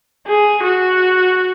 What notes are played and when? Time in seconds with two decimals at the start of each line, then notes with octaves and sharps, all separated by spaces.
0.27 G#4
0.63 F#4